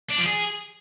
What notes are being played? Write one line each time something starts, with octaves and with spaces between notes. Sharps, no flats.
D4
F3
G#4